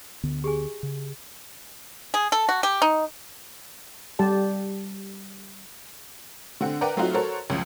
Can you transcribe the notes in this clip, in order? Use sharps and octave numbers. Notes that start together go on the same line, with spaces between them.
D2 D3 B3
G4 G#4 G#5
C#3
G#4
A4
F#4
G4
D#4
G3 G4 A5
D3 C4 F#5
A#4 B4 D5 F#5 G5 A#5
F#3 A3 C4 D#4 F4 F#4
F#4 A4 A#4 C5 C#5
C#2 F#2 F3